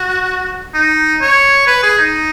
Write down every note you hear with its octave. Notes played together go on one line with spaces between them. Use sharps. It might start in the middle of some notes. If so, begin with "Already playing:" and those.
Already playing: F#4
D#4
C#5
B4
G#4
D#4